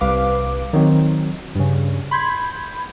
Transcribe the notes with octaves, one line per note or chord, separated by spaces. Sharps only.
C2 B4 F5 D6
D#3 F#3 C4
G2 C#3
B5 C6 G6 G#6